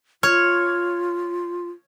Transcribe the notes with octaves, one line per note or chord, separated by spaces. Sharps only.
F4 C#5 F6